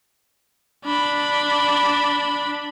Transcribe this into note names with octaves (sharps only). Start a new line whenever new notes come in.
D4 B5